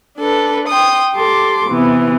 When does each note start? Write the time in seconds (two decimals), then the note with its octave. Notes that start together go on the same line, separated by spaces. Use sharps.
0.18 D4 A4 B4
0.68 G5 C6 D#6
1.14 G4 A4 C6 D6
1.69 C3 E3 B3